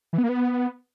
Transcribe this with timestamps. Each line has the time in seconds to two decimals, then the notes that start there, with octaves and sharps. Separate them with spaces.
0.13 E3
0.18 B3
0.24 A#3
0.29 B3